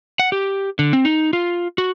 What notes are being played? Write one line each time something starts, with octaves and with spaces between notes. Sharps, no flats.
F#5
G4
D3
C4
D#4
F4
F#4